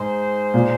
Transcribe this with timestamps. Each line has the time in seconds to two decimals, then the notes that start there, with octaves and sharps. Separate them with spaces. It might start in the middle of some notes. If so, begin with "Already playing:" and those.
Already playing: G#2 D#4 G#4 C5
0.54 A#2